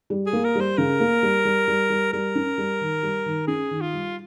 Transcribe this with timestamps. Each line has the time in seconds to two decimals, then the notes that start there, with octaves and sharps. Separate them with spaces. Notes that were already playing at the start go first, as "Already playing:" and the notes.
0.10 G3
0.26 G#4
0.33 A#3
0.44 A#4
0.55 G3
0.60 C5
0.77 C#3 A#4
1.00 A#3
1.23 G3
1.45 G3
1.68 G3
1.90 G3
2.13 G3 A#4
2.35 C#4
2.58 G3
2.81 D#3
3.03 G3
3.26 D#3
3.47 C#4 G#4
3.71 D#3
3.81 F4
3.93 G3